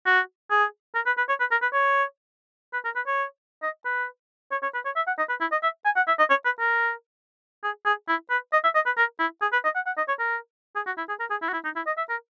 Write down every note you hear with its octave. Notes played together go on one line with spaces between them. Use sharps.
F#4
G#4
A#4
B4
B4
C#5
B4
A#4
B4
C#5
B4
A#4
B4
C#5
D#5
B4
C#5
C#5
B4
C#5
E5
F#5
D#5
B4
E4
D#5
E5
G#5
F#5
E5
D#5
C#5
B4
A#4
G#4
G#4
E4
B4
D#5
E5
D#5
B4
A#4
E4
G#4
B4
D#5
F#5
F#5
D#5
C#5
A#4
G#4
F#4
E4
G#4
A#4
G#4
E4
F#4
E4
D#4
E4
D#5
E5
A#4